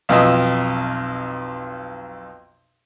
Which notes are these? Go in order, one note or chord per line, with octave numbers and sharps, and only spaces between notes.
B1 F2 D#5 E6